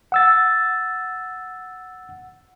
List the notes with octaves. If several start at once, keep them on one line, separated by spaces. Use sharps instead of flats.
F#5 E6 A6